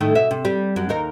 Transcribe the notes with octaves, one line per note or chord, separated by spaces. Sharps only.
A2 D#3 A3
B2 E5
C3
G3
F#2
D#2 D#4 A#4